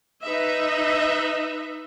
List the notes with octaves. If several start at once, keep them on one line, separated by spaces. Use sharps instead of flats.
D#4 B4 D#5 E5